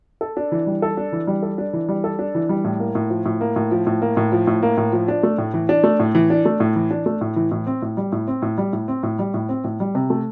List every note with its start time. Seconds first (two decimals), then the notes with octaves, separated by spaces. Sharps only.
0.21 A4
0.37 D4
0.52 E3
0.67 G3
0.82 A4
0.97 D4
1.12 E3
1.27 G3
1.43 A4
1.58 D4
1.73 E3
1.89 G3
2.04 A4
2.19 D4
2.35 E3
2.49 G3
2.64 A2
2.80 A#3
2.95 A2
3.10 F3
3.26 A2
3.41 A#3
3.56 A2
3.71 F3
3.87 A2
4.02 A#3
4.17 A2
4.32 F3
4.47 A2
4.63 A#3
4.78 A2
4.93 F3
5.08 D4
5.23 A3
5.38 A2
5.54 E3
5.69 D4
5.84 A3
6.00 A2
6.15 E3
6.30 D4
6.45 A3
6.60 A2
6.76 E3
6.91 D4
7.06 A3
7.21 A2
7.36 E3
7.51 A2
7.66 C4
7.82 A2
7.97 G3
8.12 A2
8.27 C4
8.42 A2
8.58 G3
8.73 A2
8.88 C4
9.03 A2
9.19 G3
9.34 A2
9.49 C4
9.64 A2
9.80 G3
9.95 C3
10.10 A3